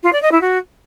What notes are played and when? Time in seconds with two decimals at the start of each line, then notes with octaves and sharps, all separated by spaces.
0.03 F4
0.13 D5
0.22 D#5
0.32 E4
0.41 F#4